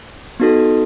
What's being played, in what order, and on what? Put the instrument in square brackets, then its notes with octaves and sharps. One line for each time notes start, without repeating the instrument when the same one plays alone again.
[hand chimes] B3 D#4 F#4 A4